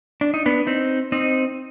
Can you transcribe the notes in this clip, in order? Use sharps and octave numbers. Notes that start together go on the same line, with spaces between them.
D4
D#4
B3 D4
C4 D#4
C4 D#4